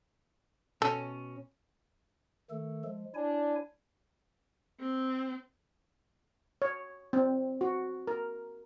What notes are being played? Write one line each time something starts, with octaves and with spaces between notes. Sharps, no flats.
B2 C#4 A4
D#3 A3 A4
F3 G#3
D4 E4 C#5 G#5
C4
C#5
C4
F#4
A#4